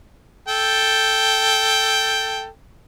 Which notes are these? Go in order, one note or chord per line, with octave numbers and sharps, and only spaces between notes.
A4 G5